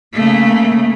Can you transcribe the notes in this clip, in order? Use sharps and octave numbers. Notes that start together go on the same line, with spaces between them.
C#3 A3 A#3